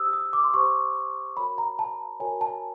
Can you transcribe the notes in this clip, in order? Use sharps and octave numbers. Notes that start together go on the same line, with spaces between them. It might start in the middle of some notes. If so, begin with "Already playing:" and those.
Already playing: G4 C5 D#6 E6
D#6
D6
C6
G4 C5 C#6
F#4 A#4 C#5 B5
A#5
A5
F#4 A#4 C#5 G#5
A5